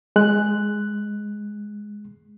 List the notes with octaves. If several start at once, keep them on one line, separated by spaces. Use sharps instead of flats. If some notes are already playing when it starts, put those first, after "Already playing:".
G#3 F#6